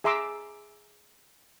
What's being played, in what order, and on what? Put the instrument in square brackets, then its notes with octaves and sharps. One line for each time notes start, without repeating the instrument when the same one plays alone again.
[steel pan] G#4 E5 A#5 C6 D6 E6